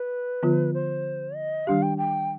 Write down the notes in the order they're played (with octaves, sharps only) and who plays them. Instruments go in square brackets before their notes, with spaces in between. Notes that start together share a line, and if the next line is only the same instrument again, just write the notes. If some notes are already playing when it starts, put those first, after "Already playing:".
Already playing: [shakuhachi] B4
[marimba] D3 F3 B3 F4
[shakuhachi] C5
D#5
[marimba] D#3 G3 D4 G4 [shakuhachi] F5
[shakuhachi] G5
G5